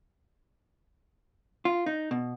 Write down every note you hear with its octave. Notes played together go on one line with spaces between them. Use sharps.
F4
D#4
B2